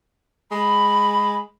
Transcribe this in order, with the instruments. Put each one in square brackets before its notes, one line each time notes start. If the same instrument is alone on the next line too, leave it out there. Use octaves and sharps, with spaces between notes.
[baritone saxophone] G#3 [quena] B5